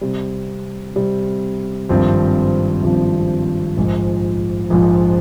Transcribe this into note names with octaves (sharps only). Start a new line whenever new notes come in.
C3 G3 C4
C3 G3 C4
G#1 G2 F3 C4
G#1 G2 F3 C4
A#1 G#2 F3
A#1 G#2 F3